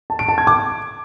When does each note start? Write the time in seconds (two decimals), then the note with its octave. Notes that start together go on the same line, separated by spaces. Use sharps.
0.10 A5
0.19 D7
0.28 A5
0.38 G#6
0.47 D6